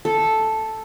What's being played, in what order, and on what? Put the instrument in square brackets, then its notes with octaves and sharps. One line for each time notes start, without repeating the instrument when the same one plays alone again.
[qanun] A4